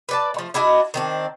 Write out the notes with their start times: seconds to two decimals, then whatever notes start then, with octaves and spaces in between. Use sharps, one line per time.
0.09 B4 D5 A5
0.34 F3 A3
0.54 D4 E4 F#4 D#5
0.94 D#3 C4 D4